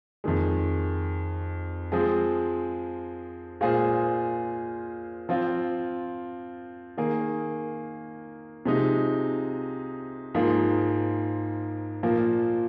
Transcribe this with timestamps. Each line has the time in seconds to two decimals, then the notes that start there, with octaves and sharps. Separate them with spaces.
0.24 F2 D#3 G#3
1.92 F3 G#3 C4 G#4
3.61 A#2 G#3 F4 G#4 C5
5.29 F3 C4 F4
6.97 D#3 A#3 G#4
8.66 C3 F3 G#3 D#4
10.35 G#2 F3 A#3 F4 G#4
12.03 A#2 F3 A#3